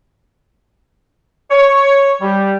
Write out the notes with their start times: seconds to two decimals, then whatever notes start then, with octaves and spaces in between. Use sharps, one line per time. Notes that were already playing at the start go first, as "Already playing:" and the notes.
1.51 C#5
2.21 G3